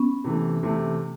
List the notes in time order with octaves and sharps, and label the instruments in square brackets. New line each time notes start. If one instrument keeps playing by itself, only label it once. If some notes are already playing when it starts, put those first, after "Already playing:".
Already playing: [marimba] B3 C#4
[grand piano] C3 E3 A3
C3 E3 A3